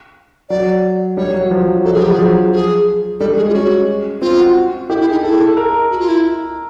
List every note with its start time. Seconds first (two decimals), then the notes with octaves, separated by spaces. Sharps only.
0.49 F#3 D5
1.17 G3 C#5
1.34 F#3
1.51 F3
1.68 F#3
1.85 F#3 A4
1.94 F3 G#4
2.01 G4
2.08 F#3 G#4
2.19 F3
2.53 G#4
3.20 G3 A4
3.37 G#3 G#4
3.49 F4
3.54 C#4 F#4
4.22 C4 F4
4.39 F#4
4.89 E4 G4
5.01 E4
5.06 G#4
5.12 D#4
5.23 E4 A4
5.40 A4
5.57 A#4
5.91 F#4
6.00 F4
6.09 E4